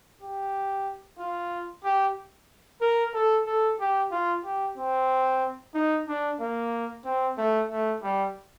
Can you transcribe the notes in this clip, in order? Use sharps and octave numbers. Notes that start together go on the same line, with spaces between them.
G4
F4
G4
A#4
A4
A4
G4
F4
G4
C4
D#4
D4
A#3
C4
A3
A3
G3